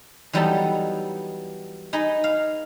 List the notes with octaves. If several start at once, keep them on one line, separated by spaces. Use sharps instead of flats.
E3 F#3 G3 B3 D#4 A4
D#4 G#4 B4 D#5 G#5
F5